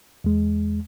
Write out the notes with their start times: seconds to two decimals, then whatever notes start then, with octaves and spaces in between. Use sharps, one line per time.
0.24 E2 G#3